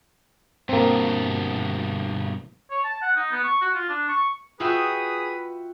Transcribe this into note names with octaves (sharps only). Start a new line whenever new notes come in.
G2 B2 A#3 C4
C#5
A5
F#5
D#4
B3
C#6
F#4
F4
D4
C#6
F4 F#4 G#4 B4 E5 G5 D#6